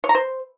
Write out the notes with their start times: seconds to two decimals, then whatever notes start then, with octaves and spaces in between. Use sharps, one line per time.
0.04 C#5
0.09 A#5
0.15 C5